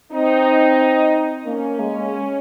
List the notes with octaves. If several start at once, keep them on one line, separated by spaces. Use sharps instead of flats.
C4 D#4
A#3 C#4
G#3